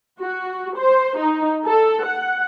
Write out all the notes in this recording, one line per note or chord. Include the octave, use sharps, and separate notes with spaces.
F#4
C5
D#4
A4
F#5